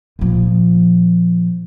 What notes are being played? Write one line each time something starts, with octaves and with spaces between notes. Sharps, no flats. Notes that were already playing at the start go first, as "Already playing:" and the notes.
A#2 F3